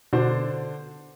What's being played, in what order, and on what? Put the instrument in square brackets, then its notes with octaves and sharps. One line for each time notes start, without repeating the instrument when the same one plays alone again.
[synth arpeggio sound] B2 [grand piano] D3 D4 C5